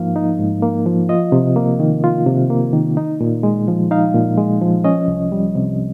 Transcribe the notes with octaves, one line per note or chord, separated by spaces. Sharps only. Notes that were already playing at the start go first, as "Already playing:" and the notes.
Already playing: G#2 F3 A#3 D#4 F5
D#4
G#2
A#3
F3
F4 D#5
C3
A#3
D#3
F4
C3
A#3
D#3
D#4
A#2
G#3
F3
D#4 F5
A#2
G#3
F3
C#4 D#5
C2
G3
C3